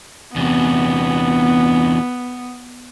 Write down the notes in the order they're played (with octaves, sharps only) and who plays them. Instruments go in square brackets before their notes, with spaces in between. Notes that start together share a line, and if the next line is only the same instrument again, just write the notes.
[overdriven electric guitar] E2 C3 [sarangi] B3